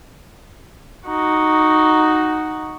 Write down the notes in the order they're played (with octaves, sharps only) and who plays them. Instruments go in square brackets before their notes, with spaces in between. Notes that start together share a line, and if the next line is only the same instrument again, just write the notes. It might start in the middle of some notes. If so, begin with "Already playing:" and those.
[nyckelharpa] D#4 F#4